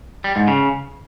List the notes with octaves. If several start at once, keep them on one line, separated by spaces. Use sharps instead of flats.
G3
G#2
C#3